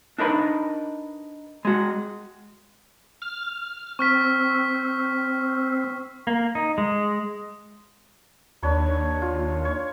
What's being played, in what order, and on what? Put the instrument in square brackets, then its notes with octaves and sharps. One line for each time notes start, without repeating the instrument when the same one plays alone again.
[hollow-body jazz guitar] D4 D#4 A#4 B4
G#3 F#4
[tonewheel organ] F6
[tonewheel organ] C4 [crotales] C#6 F6 B6
[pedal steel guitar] A#3
D#4
G#3
[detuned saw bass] D#2 [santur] D4 C#5 B5
[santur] F4
C#5